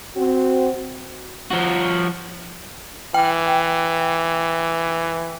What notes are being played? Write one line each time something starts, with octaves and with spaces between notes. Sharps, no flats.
C4 F#4
F3 F#4
E3 G5